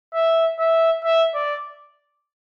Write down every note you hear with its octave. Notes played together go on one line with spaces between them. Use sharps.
E5
E5
E5
D5